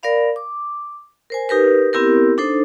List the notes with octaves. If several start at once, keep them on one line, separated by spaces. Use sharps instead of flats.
A#4 D5 F5 B5
D6
A#4 C5 G#5
D#4 G4 A#4 B4
B3 C4 E4 G4 A#4
D4 D#4 A4 C5